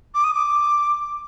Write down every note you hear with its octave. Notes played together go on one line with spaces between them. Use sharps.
D6
D#6
D6